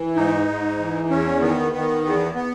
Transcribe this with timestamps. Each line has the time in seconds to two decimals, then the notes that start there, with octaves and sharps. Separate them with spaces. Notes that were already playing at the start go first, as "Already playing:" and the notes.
Already playing: E3
0.16 G#2 D#4
0.48 G#2
0.79 E3
1.10 E2 C#4
1.41 D#3 B3
1.72 D#3 B3
2.04 E2 B3
2.35 B3